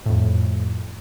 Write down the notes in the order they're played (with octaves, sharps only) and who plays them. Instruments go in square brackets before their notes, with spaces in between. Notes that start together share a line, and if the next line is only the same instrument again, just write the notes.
[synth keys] F2 A2